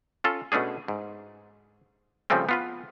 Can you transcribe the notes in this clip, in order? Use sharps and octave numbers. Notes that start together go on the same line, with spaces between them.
C#4 F4 A4
B2 A3 C#4 D4 G#4
G#2
C#3 F3 G3 A3 C4 C#4
B3 F4 B4